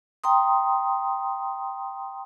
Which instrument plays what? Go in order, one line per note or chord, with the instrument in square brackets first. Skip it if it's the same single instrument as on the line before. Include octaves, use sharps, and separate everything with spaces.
[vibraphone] G5 A#5 C6 D#6